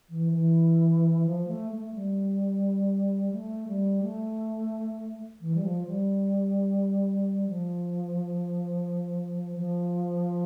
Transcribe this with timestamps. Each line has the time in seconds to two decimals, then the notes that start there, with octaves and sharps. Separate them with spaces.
0.10 E3
0.33 E3
1.25 F3
1.48 A3
1.71 A3
1.94 G3
3.33 A3
3.67 G3
4.02 A3
5.41 E3
5.55 G3
5.63 F3
5.87 G3
7.49 F3
9.57 F3